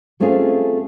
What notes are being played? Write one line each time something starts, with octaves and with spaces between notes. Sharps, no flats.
G3 A3 C4 C#4 F4 G#4